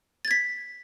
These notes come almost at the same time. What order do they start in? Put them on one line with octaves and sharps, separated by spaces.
A6 G#6 B6